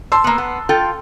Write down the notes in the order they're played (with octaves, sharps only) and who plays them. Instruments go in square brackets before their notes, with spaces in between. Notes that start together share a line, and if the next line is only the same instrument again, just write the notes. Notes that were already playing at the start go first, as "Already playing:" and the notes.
[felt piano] A5 C6 E6
[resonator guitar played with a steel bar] A#3 B3
B3
F4 A4 G5